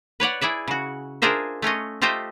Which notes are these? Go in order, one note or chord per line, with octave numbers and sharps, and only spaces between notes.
B4 C#5 D5 F#5
E4 G#4 D5 E5
C#3 F#4
D4 F4 G#4 A#4 C5 E5
A3 C#4 F4 D#5
A3 F4 G4 C5 D#5 E5